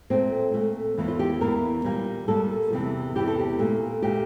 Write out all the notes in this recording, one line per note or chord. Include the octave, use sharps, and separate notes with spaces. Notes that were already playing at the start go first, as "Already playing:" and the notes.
A#2 A3 C4
A#2 A3
E2 E3 A#3
F4
G4
E2 E3 A#3 A#4
A#2 G3 A#3
A#2 G3 A#3 A4
E2 C3 E3
E2 C3 E3 G4
A4
G4
A#2 A3
A#2 A3 G4